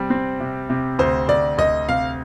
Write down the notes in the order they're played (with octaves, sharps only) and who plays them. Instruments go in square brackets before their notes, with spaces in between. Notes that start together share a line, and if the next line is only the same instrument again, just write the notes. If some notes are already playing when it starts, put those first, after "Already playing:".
Already playing: [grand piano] C3 G3 C4
C4
C3
C3
[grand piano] D2 [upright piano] C5
[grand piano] D2 [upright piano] D5
[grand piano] D2 [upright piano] D#5
[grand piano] C3 [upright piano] F5